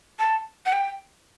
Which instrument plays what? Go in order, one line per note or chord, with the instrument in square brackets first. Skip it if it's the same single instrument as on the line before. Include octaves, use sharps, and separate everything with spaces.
[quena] A5
F#5
G5